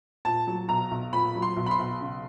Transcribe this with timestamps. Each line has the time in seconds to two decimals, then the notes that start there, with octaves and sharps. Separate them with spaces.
0.25 A#2 A5
0.47 F#3
0.69 B1 A#5
0.91 B1
1.12 A#2 B5
1.35 F#3
1.42 C6
1.56 B1
1.66 B5
1.71 C6
1.79 B1
2.00 C#3